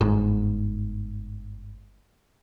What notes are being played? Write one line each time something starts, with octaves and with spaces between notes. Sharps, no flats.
G1 G#2